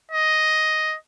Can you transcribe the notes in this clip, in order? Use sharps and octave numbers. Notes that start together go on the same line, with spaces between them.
D#5